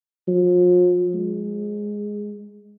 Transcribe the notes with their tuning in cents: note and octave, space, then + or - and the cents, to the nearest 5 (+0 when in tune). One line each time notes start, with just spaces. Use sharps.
F3 +40
G#3 +0